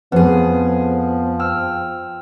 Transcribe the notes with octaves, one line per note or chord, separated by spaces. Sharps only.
F2 F3 B3 G#4 B4
G5 E6 F6